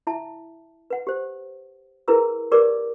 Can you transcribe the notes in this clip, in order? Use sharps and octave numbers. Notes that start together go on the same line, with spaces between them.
E4 E5 A5
B4 F#5
G4 C5
E4 G#4 A#4 B4 A#5 E6
G4 A#4 B4 D5 D6